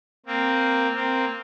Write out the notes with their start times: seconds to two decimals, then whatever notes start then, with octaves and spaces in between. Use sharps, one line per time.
0.26 A#3 C4
0.94 A#3 C4